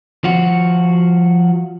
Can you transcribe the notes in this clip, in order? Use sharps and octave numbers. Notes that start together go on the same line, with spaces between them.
F3 F#4